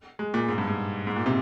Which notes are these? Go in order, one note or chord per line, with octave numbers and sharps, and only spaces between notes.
G#3
A#2
G#2
G2
G#2
G#2
A#2
C3